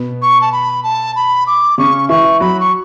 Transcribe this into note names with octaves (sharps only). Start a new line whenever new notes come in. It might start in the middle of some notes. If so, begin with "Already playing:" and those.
Already playing: B2 B3
C#6
A5
B5
A5
B5
D6
C#3 C#4 C#6
E3 E4 C#6
F#3 F#4 B5
C#6